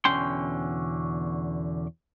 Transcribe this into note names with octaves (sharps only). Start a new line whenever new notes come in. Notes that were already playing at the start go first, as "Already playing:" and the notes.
E2 B2 D3 C#4 G5 C6